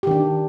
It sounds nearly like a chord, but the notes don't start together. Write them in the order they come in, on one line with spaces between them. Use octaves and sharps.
G4 D#3 D4